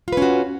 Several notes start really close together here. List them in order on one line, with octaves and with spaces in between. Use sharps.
F4 B4 C#4 F#4